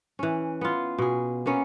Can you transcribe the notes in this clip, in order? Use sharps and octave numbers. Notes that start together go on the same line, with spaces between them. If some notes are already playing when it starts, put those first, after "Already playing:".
E3 C#4
B3 F4
B2 G#4
A#3 B3 C#4